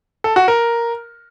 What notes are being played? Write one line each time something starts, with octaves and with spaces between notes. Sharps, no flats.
A4
F#4
A#4